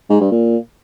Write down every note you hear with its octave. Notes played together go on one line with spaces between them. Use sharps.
G#2
G2
A#2